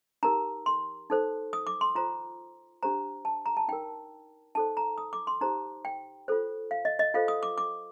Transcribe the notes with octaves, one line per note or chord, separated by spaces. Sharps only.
D#4 G4 A#4 A#5
C6
D#4 A4 C5
D#6
D6
C6
F4 C5 A#5
D4 G4 C5 A#5
A5
A#5
A5
D#4 A#4 G5
D#4 A4 C5 A5
A#5
D#6
D6
C6
D#4 G4 C5 A#5
G5
F4 A4 C5
F5
D#5
D#5
F4 A4 C5 F5
D#6
D6
D6